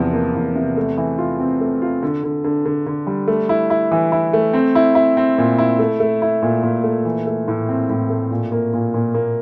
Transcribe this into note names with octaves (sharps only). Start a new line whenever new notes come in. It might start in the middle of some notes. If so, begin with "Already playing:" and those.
Already playing: E2 C3 F3
A#3
E2
C3
A3
E3
F4
C4
A3
F4
D3
D3
D3
D3
D3
G3
A3
E4
E4
E3
E4
A3
C4
E4
E4
C4
A#2
E4
A3
A3
E4
A#2
A#2
A3
E3
A3
A2
C4
A2
A3
A#2
A#3
A#2
A#2
A#3